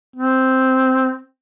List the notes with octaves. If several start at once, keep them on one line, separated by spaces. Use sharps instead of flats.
C4